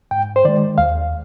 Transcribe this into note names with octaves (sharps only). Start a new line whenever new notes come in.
G#2 G5
C5
D#3 G#3 D5
D#2 F5